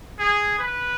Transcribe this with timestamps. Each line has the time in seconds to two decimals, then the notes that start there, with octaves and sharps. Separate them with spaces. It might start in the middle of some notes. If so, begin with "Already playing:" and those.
0.19 G#4
0.59 B4